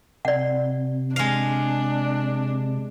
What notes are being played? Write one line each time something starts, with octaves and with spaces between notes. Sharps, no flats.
C3 D5 F#5
G#3 D4 F5